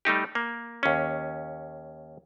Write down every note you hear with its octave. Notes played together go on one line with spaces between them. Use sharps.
G3 A3 D#4 G4
A#3
D#2 C#4